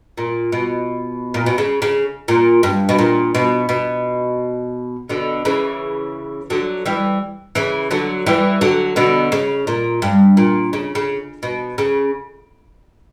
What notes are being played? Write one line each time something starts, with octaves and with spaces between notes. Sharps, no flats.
A#2
B2
A#2
B2
C#3
C#3
A#2
G2
B2
A#2
B2
B2
B2 D3
C#3 E3
D3 F#3
E3 G3
C#3 E3
D3 F#3
E3 G3
D3 F#3
B2 D3
C#3
A#2
G2
A#2
C#3
C#3
B2
C#3